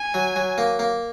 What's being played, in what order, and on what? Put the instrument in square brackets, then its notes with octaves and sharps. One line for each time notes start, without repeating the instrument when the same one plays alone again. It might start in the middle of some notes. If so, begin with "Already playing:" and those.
Already playing: [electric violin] G#5
[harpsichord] F#3
F#3
A#3
A#3